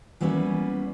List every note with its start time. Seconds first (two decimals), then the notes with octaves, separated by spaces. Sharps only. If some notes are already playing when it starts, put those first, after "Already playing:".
0.21 E3 F#3 G3 A#3 B3 C#4